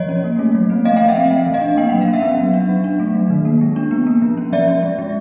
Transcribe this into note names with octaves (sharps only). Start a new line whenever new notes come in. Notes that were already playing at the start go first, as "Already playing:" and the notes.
Already playing: F3 C#5 D#5
C#4
A#3
A3
F#3
C4
A3 D#5 F5
F3 F5 G5
E5 F#5
C4 F5 G5
A3
E3
D#5 F5
D4
A#3 G5
F#3 F#5
F5
C#4
E5 F#5
B3
F#3
D4
F#3
D4
A3
F#3
D#3
A#3
G#3
D4
B3
A#3
F3
C#4
F3 D5 E5
C#4
G#3
G#3